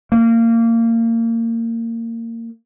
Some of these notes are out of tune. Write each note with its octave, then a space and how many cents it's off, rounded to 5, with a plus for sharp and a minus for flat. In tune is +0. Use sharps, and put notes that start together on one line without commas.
A#3 -25